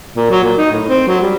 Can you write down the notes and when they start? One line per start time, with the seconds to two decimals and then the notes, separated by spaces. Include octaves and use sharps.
0.16 A#2
0.30 F#3
0.44 A#2
0.57 D#4
0.72 A2
0.89 C4
1.07 F#3
1.21 G3